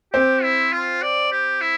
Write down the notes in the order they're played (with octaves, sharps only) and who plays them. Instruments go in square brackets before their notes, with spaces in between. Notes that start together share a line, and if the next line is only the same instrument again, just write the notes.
[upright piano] C4 [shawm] G4
[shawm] E4
F4
D5
G4
E4